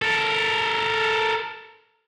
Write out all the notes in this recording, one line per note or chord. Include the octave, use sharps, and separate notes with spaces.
A4 A#4